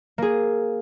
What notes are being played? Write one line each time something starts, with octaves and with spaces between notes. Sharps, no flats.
A#3 G#4